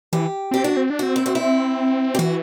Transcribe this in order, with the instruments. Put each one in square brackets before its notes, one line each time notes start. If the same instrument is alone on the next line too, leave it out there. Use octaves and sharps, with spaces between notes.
[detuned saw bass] E3 [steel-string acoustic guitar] G4
[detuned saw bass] C4 [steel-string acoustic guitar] G4
[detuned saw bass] D4 [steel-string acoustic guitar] F#4
[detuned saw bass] C4
D4
[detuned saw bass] C4 [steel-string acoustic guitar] F#4
[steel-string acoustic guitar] E4
F#4
E4
G4
[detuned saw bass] E3 [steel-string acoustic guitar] F#4